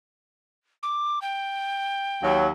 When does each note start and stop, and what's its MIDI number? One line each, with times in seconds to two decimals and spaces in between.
0.83 1.19 86
1.22 2.38 79
2.22 2.48 39
2.22 2.48 54